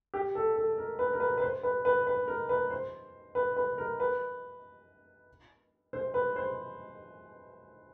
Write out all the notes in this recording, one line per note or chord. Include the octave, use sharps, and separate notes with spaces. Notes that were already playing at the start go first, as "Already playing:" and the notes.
G4
A4
A4
A#4
B4
A#4
B4
B4
C5
B4
B4
B4
A#4
B4
C5
B4
B4
A#4
B4
C5
B4
C5